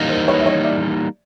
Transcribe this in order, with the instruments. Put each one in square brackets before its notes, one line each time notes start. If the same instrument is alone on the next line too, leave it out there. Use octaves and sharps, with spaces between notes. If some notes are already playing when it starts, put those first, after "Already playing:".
Already playing: [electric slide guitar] E3 G3 A#3 D#4
[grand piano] A#4 C5
B4 C#5
E5
C#5 D#5
D5 E5